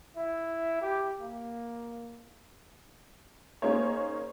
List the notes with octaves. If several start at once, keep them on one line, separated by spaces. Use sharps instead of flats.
E4
G4
A#3
A#3 C#4 D#4 G#4 C5 C#5